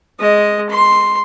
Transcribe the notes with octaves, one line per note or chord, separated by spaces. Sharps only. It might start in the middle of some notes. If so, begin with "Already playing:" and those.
G#3 D#5
C6